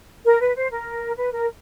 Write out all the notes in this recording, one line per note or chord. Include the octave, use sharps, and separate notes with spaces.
A#4
B4
C5
A#4
B4
A#4